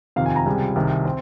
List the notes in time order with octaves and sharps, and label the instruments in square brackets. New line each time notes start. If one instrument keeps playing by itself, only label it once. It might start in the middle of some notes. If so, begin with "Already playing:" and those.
[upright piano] F2 C3 D#3 F5
G#5
A#5
C#2 C3 G3 G#5
C2 C3 D#3
C4